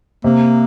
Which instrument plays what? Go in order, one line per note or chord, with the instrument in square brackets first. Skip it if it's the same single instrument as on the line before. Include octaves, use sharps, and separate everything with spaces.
[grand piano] C3 [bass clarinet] A#3